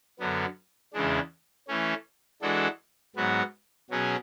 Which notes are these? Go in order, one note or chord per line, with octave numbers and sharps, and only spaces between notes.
F#2 D3 F#3 B3
E2 C#3 E3 G#3 D4
E3 A3 C#4
E3 G#3 D4 F#4 A4
G#2 F#3 B3 F#4
B2 F#3 C#4 G#4